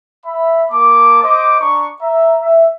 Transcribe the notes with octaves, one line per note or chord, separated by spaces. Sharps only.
E5 B5
A#3 A5 D6
C5 D#5 D6
D4 A#5 C#6
E5 A#5
E5